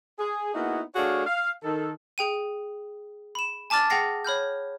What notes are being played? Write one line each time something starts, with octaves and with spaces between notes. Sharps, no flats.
G#4
A#3 B3 D#4 E4 F#4 G#4
A3 D4 F#4 G#4 C#5 F5
F5
D#3 A4
G#4 G5 D#7
B5 E7
G#5 A5 D6 F6 A6
G#4 F#5 G5 A#6 C7
C#5 B5 F6 G6